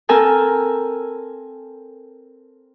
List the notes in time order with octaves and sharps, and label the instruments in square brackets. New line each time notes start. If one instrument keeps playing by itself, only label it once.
[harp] C4 A4 A#4 G#5 F6